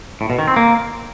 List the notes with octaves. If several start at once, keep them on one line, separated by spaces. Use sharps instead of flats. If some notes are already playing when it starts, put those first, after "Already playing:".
A2
B2
D#3
C4
A#3